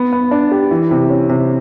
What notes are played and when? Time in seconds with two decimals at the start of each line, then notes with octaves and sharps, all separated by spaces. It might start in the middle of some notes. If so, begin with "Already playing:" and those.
Already playing: B3
0.13 B3
0.31 D4
0.51 G4
0.71 E3
0.91 C3
1.10 C#4
1.29 C3